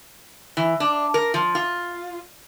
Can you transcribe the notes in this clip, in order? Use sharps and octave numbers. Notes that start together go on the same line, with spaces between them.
E3
D4
A#4
F3
F4